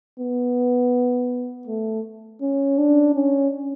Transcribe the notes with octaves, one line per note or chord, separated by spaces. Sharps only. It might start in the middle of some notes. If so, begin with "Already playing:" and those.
B3
A3
C#4
D4
C#4